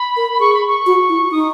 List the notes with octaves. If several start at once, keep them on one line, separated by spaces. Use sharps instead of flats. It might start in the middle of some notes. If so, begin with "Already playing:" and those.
Already playing: B5
A#4
G#4 C#6
B5
C#6
F#4
E4
D#4 D#6